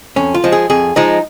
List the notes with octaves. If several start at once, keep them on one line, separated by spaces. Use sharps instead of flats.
F2 C#4
F4
F3 G#3
G#4
F2 G#4
F3 G#3 D#4